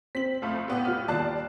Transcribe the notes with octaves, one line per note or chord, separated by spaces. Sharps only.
C4 B6 F#7
F2 A3 F5 B5
A2 B3 G4
F4 F6
D#2 D5 A5 F#6 C7